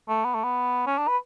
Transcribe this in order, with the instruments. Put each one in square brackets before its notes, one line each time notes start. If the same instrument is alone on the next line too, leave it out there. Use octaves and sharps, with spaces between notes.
[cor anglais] A3
B3
A3
B3
C#4
D4
B4